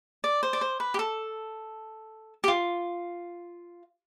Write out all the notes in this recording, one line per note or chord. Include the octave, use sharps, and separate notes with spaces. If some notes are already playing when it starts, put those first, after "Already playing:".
D5
C5
D5
C5
B4
G4
A4
G4
F4